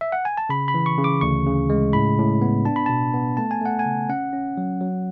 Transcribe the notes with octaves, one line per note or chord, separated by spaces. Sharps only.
E5
F#5
G#5
A5
C#3 B5
B5
E3
C#6
C#3
D6
D2 C#6
C#3
G#3
A2 B5
A2
B3
D4 A5
B5
B2 A5
B3
A3 A5
G#5
A3 F#5
G#5
C#3
C#4 F#5
C#4
F#3
F#3